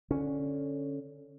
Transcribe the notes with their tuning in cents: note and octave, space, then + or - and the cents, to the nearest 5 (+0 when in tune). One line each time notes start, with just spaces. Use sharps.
D3 -5 C#4 +0